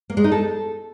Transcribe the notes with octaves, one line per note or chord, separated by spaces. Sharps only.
A#3
G#3
D#4
A4